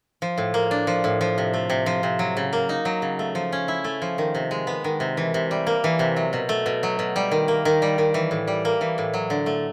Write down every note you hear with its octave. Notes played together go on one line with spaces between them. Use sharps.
F3
A2
A#3
D4
F3
A2
F3
C3
A3
C3
F3
C3
F#3
C#3
A#3
D#4
F#3
C#3
A3
F3
C#4
E4
A3
F3
D#3
C3
G#3
B3
D#3
C3
E3
C3
G3
A#3
E3
C3
F#3
B2
A3
B2
F#3
B2
G3
D#3
A#3
D#3
G3
D#3
E3
A2
G3
A#3
E3
A2
F#3
D3
A3